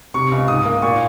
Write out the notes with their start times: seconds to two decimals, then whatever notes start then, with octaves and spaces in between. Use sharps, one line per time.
0.14 C3 C#6
0.31 C#2
0.48 G#2 D#6
0.65 A#3
0.82 A#2 C#6